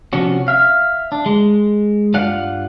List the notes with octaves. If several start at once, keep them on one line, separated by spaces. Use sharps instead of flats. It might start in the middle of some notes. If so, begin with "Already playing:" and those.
C3 F3 C#4 D4 F#4
E5 F5
D4
G#3
G2 F4 D5 F5 F#5